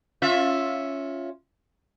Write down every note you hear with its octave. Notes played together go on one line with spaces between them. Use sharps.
C#4 F4 E5